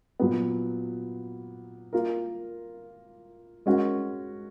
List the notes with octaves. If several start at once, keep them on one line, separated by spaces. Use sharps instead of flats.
A#2 F#3 B3
A#3 F4 A#4
G#3 C#4 F#4 A#4